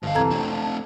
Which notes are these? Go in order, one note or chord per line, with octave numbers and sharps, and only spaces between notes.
G1 G#2 D#5 F5 A5
C2 F2 E3 A4 A#5 G#6
A3 C4 D4 F4